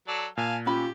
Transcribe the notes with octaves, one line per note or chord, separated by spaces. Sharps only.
F#3 A4 D5
A#2 F5 G#5 A5
C#4 F4 G4 G5 B5